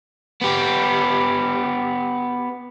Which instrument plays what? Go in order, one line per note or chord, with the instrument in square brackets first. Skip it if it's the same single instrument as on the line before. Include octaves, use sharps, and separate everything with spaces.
[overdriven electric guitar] B3 G4